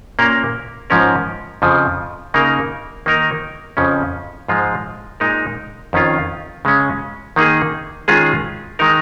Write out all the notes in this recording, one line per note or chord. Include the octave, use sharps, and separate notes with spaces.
A#2 A#3 C#4 A#4
G#2 F3 C#4 A#4
F2 C#3 F3
C#3 A#3 D#4 A#4
D#3 A#3 D#4 A#4
F2 C#3 F3 C#4
G#2 F3 G#3 F4
A#2 G#3 D#4 A#4
F2 D#3 C#4 F4
C#3 G#3 C#4
D#3 A#3 D#4 G#4
D#3 G#3 C#4 F4 G#4
D#3 G#3 D#4 A#4